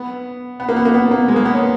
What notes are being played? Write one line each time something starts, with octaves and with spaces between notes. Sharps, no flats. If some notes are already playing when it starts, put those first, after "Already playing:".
Already playing: B3
B3
A#3
B3
A#3
B3
A#3
G#3
A#3
B3
C#4